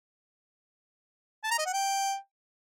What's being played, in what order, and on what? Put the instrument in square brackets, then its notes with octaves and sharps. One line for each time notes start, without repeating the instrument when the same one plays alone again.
[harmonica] A5
A#5
D#5
F#5
G5